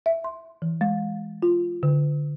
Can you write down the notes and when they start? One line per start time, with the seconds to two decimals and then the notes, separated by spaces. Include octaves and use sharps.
0.06 E5
0.24 C6
0.62 E3
0.81 G#3
1.42 F4
1.83 D3